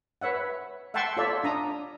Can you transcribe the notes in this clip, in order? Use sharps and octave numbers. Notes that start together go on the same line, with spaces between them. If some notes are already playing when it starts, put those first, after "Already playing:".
B4 C#5 E5 F#5
E5 F#5 G5 A5 C6 C#6
F4 A4 C#5 D5 E5
D4 A#5 D#6